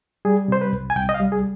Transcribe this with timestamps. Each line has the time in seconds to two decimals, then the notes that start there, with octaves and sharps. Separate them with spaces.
0.25 G3 G#4
0.48 C3 C5
0.61 B4
0.73 C2
0.90 G#5
0.96 C2 G5
1.09 D#5
1.14 F5
1.20 G3
1.32 G#4